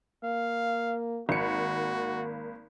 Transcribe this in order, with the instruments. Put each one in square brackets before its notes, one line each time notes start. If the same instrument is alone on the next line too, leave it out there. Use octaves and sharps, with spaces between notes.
[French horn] A#3 [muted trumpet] F5
[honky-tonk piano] G#1 C#7 [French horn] A#3 [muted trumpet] F#4